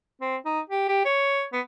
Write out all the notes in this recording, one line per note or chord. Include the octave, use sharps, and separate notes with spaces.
C4
D#4
G4
G4
C#5
B3